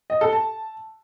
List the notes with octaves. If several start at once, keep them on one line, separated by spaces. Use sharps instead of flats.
D#5
A4
A5